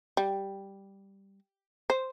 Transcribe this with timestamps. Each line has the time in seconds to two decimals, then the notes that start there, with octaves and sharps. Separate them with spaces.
0.17 G3
1.90 C5